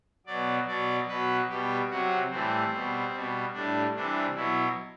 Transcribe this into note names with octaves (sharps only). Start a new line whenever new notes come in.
B2 F#3 D5
B2 F#3 D5
B2 F#3 B4
B2 G3 G4
C3 F#3 F#4
A2 E3 G3 C4
B2 G3
B2 G3
A2 G3 D4
C3 E3 G3 D4
B2 F#3 E4